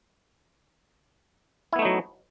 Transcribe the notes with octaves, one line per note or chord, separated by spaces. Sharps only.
F#3 A3 B3 D#4 E4